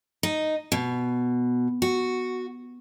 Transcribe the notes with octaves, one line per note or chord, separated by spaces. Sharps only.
D#4
B2
F#4